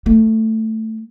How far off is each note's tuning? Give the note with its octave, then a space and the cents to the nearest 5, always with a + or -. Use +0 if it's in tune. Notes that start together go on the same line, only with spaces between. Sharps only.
A3 +10